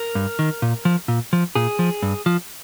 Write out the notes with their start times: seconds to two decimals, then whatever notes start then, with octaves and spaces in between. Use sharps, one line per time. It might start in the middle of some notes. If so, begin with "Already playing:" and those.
Already playing: A#4
0.15 G2
0.39 D#3
0.62 A#2
0.85 F3
1.08 A#2
1.33 F3
1.55 A#2 G#4
1.79 F3
2.02 G2
2.26 F3